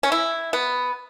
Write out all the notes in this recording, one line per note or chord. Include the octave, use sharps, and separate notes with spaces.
C#4
E4
B3